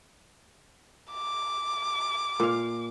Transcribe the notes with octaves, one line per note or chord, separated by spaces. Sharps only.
D6
A#2 F5